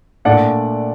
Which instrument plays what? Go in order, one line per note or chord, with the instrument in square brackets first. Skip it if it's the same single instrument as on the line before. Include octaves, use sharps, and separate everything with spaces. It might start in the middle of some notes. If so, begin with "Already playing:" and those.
[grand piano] A#2 A3 D4 [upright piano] D5 F#5